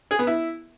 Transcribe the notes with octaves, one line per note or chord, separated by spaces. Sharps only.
G#4
B3
E4